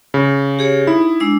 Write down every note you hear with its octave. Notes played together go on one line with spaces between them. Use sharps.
C#3
G4 G#4 C#5
D#4 E4
G#3 D4 E6